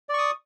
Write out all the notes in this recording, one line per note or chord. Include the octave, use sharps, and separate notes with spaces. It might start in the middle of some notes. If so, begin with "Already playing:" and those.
D5 C#6 D#6